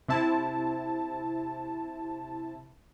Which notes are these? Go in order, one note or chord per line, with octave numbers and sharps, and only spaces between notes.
C3 C4 E4 A5